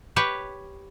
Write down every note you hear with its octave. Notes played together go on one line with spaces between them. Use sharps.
G4 B4 C#5